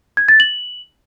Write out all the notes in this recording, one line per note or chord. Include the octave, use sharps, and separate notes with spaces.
G#6
A6
F#7